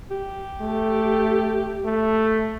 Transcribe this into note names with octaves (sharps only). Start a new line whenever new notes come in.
G4
A3
A3